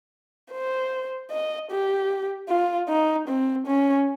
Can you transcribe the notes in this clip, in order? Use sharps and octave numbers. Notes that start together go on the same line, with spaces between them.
C5
D#5
G4
F4
D#4
C4
C#4